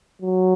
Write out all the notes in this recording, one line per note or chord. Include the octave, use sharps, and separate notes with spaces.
F#3